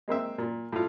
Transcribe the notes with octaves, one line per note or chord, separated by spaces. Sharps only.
G#3 A#3 C4 E5
A#2
A2 F4